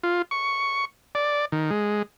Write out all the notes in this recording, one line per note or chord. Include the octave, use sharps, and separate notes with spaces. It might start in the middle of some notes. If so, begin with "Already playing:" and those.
F4
C#6
D5
D#3
G#3